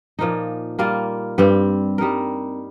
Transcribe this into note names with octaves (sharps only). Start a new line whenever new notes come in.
A#2 F3 A#3 D#4
G3 A#3 F4 A#4
G2 G3 C4
G3 D#4 A#4